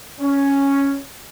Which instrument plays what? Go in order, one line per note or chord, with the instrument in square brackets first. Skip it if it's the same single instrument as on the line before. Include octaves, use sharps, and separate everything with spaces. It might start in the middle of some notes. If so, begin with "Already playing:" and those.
[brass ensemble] C#4